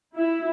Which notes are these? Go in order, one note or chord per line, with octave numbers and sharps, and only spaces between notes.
E4